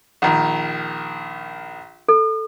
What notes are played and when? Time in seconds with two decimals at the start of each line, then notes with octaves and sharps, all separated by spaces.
0.22 A#1 D#3
2.08 A4